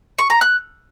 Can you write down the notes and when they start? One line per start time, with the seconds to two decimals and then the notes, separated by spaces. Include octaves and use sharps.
0.19 C#6
0.30 A#5
0.41 F#6